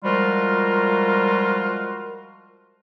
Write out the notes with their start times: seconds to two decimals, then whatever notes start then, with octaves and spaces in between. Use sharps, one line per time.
0.04 F3 G3 G#3 F4 F#4 A#4